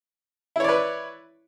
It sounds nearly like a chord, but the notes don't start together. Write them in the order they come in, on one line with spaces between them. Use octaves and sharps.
E4 C#5 D5 B4